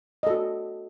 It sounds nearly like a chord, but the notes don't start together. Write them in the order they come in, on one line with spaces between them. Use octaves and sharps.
D#5 A4 F#4